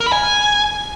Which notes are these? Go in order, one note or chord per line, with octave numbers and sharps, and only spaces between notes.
A#4
B5
G#5